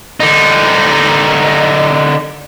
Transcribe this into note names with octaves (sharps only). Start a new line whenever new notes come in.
D3 D#4